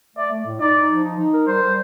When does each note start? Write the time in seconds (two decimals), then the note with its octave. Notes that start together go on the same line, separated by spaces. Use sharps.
0.17 A3 D5
0.32 A3
0.46 A2
0.60 D#4 D5
0.76 D#4
0.90 F3
1.04 D#4
1.19 D#4
1.34 A#4
1.47 G3 C5
1.63 G3